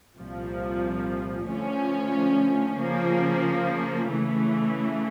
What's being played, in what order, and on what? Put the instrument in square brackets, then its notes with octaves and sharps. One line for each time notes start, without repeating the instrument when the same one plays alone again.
[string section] C2 A#2 F3
D3 F3 A3 C#4
C#3 F3 A#3
C#3 E3 A3